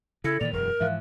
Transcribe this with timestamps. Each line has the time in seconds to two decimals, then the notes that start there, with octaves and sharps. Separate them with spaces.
0.24 C#3 E4 A4 A#6 C#7
0.41 A#2 D#3 E3 D5 F7
0.53 E1 F#2 A#4
0.80 G#2 E3 F3 E5 F5 F#6